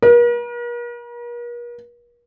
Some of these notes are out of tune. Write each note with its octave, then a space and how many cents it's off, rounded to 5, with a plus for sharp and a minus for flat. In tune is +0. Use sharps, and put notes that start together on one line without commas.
A#4 +45